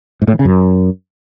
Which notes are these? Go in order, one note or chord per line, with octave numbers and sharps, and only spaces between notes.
G#2
A2
E3
C#3
F#2